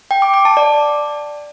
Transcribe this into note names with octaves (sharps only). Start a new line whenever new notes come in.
G5
D6
D6
A5
D5